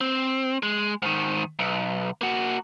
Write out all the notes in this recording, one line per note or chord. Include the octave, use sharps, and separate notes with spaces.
C4
G#3
G#2 D#3
B1
A#3 F#4